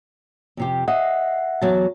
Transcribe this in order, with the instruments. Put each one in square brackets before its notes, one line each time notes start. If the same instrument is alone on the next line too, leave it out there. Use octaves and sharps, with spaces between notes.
[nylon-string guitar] F2 C3 G4
[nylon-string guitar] D#5 [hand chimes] E5 F#5
[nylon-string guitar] E2 F#3 A5